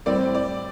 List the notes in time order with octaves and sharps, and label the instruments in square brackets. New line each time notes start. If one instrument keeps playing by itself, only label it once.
[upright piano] A2 G3 C4 [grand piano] D5
[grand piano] D5